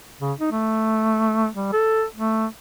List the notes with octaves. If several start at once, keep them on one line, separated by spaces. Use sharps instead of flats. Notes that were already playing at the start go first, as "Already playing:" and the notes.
C#3
D#4
A3
G3
A4
A3